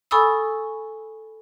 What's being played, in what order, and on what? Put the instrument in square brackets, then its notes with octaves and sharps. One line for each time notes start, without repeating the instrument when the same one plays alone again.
[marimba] A4 G#5 B5 C#6 D#6 E6